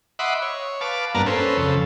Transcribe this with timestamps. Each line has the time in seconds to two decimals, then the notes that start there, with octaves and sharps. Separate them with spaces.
0.19 D#5 E5 F#5 B5 C6 D6
0.42 C#5
0.81 B4 F5 A5 D6
1.14 G2 A#3 B3 D4 A#4 A5
1.26 C#4 A4 B4 C5
1.57 F2 C#3 A4